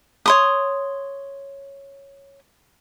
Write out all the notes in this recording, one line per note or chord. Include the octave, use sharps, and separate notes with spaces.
C#5 C6 D#6